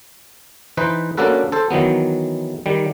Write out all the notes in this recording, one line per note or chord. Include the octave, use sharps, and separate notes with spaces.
E3 D#4 B4 C5
A#3 C#4 D4 F#4 A4 B4
A4 C5
D#3 E3 F#3 B3
D#3 G3